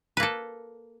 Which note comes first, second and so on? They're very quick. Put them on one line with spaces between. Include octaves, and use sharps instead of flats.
B4 A#3 A4